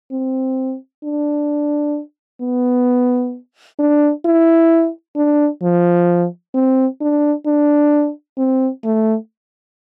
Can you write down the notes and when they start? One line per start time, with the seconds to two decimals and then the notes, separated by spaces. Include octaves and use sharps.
0.11 C4
1.04 D4
2.41 B3
3.79 D4
4.25 E4
5.16 D4
5.62 F3
6.54 C4
7.01 D4
7.46 D4
8.37 C4
8.84 A3